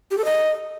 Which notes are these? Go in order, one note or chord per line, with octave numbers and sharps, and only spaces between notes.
G4
A4
D#5